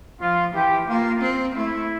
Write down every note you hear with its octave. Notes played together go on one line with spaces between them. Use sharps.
F3 F4
E3 G4
A#3 F4
C4
A3 E4